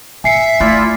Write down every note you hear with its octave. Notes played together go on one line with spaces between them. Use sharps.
G#2 E5 G#5 C7 C#7
A3 E4 F4 D5